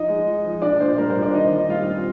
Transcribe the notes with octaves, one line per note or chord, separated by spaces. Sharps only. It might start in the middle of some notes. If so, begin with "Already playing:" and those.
Already playing: F3 D#4 D#5
G#3
F3
F3
A#2 D4 D5
A#2 C5
G3 A#4
C5
A#2
D4 D5
D#3 D#4 D#5
D#3
G3 F4 F5
C4